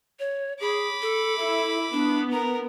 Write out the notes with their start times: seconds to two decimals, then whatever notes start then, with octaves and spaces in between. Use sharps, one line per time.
0.19 C#5
0.61 G#4 B5 D6
1.02 A4
1.38 E4 A4
1.93 B3 D4
2.32 A#4 A#5